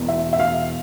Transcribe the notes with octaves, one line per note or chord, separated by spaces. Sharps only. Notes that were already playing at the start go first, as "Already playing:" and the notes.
Already playing: E1 E2
E5
E5
F5